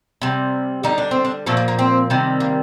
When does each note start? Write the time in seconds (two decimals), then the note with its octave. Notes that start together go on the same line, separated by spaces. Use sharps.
0.22 C3 G3
0.83 D3 G3 D#4
0.98 D4
1.11 C4
1.25 D4
1.46 A#2 F3 A3 A4
1.57 A#3
1.68 A#3
1.79 C4
2.10 C3 D#3 G3
2.40 A#3